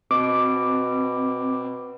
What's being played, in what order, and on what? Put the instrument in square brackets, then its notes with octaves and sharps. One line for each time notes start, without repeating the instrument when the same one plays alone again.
[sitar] B2 [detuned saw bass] C4 [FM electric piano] D6